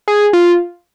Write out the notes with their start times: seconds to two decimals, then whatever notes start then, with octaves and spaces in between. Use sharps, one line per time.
0.08 G#4
0.33 F4